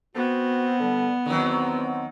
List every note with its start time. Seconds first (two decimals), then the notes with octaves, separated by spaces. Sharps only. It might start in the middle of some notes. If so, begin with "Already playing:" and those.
0.15 B3 C4 F#4
0.79 D3 G3
1.26 E2 D#3 F#3 C4